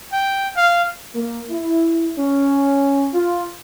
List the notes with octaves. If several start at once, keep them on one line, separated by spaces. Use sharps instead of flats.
G5
F5
A#3
E4
C#4
F4